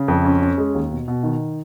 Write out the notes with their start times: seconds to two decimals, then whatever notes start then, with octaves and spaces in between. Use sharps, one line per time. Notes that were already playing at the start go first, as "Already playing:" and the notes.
Already playing: C#3
0.08 F2
0.25 C#4
0.42 C#4
0.58 G#3
0.74 D#2
0.92 B2
1.08 B2
1.23 D#3